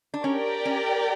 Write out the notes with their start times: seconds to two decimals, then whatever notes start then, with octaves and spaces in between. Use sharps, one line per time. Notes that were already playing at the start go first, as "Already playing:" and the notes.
0.14 D4
0.24 C#4 G4 A#4 D5 G5
0.65 C#4